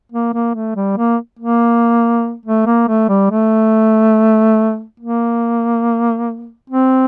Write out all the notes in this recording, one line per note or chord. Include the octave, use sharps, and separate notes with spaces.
A#3
A#3
A3
G3
A#3
A#3
A3
A#3
A3
G3
A3
A#3
C4